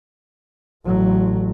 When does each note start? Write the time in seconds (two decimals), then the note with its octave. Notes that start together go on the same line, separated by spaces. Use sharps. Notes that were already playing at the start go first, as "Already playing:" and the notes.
0.86 A1 F#3